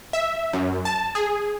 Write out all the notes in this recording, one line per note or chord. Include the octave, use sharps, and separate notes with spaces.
E5
F#2
A5
G#4